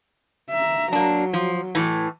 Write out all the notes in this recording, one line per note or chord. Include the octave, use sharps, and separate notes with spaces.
E5 A#5
F#3 A#3 D4
F3
A2 E3